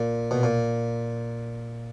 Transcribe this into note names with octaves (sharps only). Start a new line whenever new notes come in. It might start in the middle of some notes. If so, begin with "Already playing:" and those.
Already playing: A#2
B2
A#2